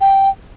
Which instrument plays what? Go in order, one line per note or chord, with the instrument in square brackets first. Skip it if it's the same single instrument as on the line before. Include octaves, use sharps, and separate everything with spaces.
[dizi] G5